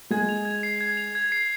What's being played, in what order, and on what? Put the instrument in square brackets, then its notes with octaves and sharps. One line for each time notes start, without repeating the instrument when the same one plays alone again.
[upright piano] G#3 G#4 [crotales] G#6
[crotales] F7
G#6
C7
G#6
F7
G#6
C7